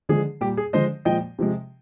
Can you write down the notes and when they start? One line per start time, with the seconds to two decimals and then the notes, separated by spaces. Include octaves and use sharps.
0.09 D3 F3 G#3 G#4
0.41 A#2 G3 G4
0.57 G#4
0.73 D3 F3 G#3 C5 D#5
1.05 A#2 F3 G#3 D#5 G5
1.39 C3 F3 G#3